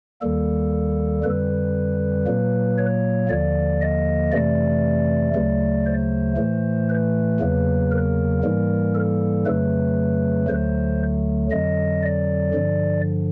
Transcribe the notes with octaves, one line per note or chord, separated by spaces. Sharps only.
D#2 D#3 G3 A#3 A4
F2 D3 G3 B4
A#2 F#3 A#3
C#5
D#2 D3 F3 A#3 D5
D#5
F2 C3 E3 A3 D5
D2 C#3 F#3 A3
C5
A2 E3 A3
B4
E2 C#3 F#3 A#3
A#4
G#2 E3 G3 A#3
A4
F2 C#3 F#3 A3 B4
D2 D3 F#3 A3 C5
F2 D3 F#3 D#5
D5
G2 D3 F3